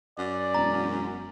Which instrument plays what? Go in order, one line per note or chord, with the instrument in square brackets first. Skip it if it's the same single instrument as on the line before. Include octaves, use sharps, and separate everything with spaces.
[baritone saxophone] F#2 [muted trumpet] D5
[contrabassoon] E1 [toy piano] A#5